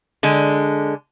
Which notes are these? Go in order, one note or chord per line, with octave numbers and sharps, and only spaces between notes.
D3 G#3